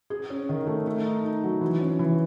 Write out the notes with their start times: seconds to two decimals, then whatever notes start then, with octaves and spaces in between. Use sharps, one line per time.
0.10 G#4
0.30 C#4
0.49 D#3
0.67 A3
0.87 A3
1.05 D#4
1.24 D#4
1.43 F#3
1.61 E3
1.80 C#4
1.99 E3